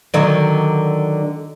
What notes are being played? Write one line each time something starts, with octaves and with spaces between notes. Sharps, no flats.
D3 D#3 F#3